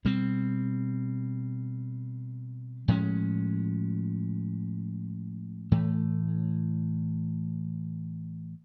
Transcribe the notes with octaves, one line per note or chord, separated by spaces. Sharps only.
B2 G3 C4
A2 F3 G#3 C#4
A2 E3 A3